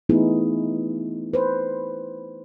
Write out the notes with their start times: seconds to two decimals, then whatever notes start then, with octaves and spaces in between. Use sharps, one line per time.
0.09 E3 A3 B3 D#4 E4 G#4
1.33 B4 C5